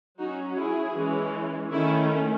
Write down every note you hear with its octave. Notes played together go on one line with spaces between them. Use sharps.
F#3 C#4 D#4 F#4
E4 G#4
E3 G#3 C#4
D#3 A3 C#4 E4